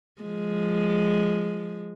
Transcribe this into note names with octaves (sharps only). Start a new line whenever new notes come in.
F3 G#3